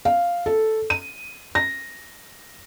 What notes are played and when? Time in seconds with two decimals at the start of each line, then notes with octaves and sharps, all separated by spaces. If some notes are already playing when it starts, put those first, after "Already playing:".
0.05 F5
0.46 A4
0.90 D#7
1.55 A#6